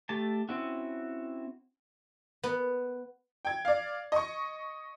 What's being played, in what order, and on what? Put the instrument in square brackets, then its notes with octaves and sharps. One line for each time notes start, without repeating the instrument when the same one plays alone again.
[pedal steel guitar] A3 G4 A5
C4 C#4 E4 F#4
[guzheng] B3
[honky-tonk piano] G5 G#6
D5 F5
D#5 C#6